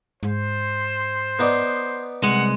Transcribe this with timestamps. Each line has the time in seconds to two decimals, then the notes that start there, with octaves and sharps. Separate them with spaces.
0.23 G#2 C5
1.39 B3 D#4 D5
2.24 C2 G#3 F#5